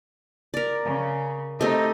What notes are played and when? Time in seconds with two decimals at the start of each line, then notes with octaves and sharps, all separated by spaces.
0.54 A#4 D5
0.85 C#3
1.61 A3 C4 D#4 G4 D#5